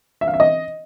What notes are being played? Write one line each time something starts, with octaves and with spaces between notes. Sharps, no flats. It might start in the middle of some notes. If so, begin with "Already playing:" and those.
E5
F5
E5
D#5